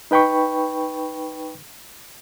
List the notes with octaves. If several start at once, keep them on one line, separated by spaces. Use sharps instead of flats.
D#4 B4 G5 B5 C#6